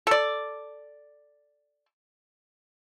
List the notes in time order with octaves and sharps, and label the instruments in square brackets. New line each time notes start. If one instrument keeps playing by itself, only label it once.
[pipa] A4 D5